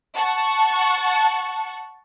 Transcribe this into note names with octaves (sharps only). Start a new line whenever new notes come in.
F#5 A5 C#6